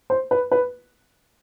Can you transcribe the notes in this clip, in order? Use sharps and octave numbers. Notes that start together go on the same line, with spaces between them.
C5
B4
B4